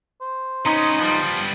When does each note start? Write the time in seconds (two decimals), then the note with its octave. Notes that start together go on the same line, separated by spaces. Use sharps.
0.21 C5
0.66 B3 C#4 D#4 A#5 C6 D#6
0.99 F3 G3 B3